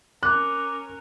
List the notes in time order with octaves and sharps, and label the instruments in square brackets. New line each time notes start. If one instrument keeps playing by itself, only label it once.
[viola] C#4 A#4 [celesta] D6 [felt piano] F#6